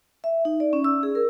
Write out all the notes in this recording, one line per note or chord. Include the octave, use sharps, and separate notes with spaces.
E5
D#4
D5
C#4
E6
G#4
A#4